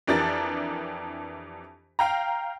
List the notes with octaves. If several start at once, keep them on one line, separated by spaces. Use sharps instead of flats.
F2 E3 D4 G4 A#4 A6
F5 G5 A#5